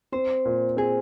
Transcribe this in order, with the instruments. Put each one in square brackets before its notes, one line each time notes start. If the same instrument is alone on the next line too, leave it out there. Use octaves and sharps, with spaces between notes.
[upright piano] C4 [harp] C5
[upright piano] A#2
[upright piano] C4 [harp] G#4